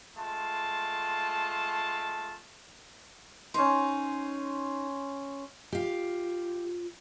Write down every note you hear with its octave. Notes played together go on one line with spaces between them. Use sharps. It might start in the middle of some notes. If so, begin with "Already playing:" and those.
G#3 A3 F4 A5
C#4 D#4 C5
F4 G4 F5